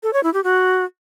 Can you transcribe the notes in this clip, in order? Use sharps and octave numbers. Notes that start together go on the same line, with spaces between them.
A4
C#5
E4
G4
F#4